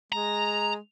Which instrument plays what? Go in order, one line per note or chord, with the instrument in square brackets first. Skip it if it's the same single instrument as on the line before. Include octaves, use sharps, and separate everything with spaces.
[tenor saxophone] G#3 [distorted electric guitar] A#5